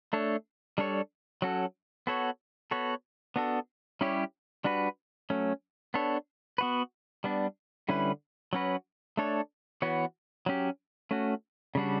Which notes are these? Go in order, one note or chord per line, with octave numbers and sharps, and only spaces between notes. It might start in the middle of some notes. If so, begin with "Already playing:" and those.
A3 D4 A4 C#5
G3 D4 A4 C#5
F#3 C#4 F#4 A4
B3 F#4 A4 C#5
B3 F#4 A4 C#5
B3 D4 F#4 A4
G3 C#4 E4 G4 C#5
G3 D4 F#4 B4
F#3 A3 C#4
B3 D4 A4 C#5
B3 F#4 B4
G3 B3 D4
D3 G3 C#4 E4 B4
F#3 C#4 F#4 B4
A3 D4 A4 C#5
E3 B3 F#4 C#5
F#3 C#4 G4
A3 C#4 F#4
C#3 G3 D4 F#4